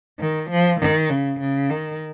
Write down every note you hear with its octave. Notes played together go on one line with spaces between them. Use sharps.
D#3
F3
D#3
C#3
C#3
D#3